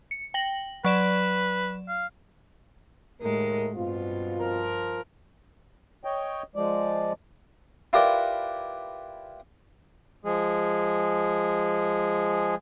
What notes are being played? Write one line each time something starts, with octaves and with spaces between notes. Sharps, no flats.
C#7
G5 A#6 F#7
F#3 B4 D5 E7
F5
D#2 A2 G#3 A3 A#4
G2 B2 C4 F4
F3 A#4
C#5 D#5 G5
F3 G#3 D5
E4 F4 G4 A#4 B4 D5
F3 G#3 G#4